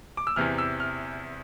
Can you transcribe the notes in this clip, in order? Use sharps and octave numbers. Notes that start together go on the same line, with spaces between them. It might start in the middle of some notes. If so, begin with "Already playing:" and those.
D6
E6
E2 C3 E3 F6
E6
F6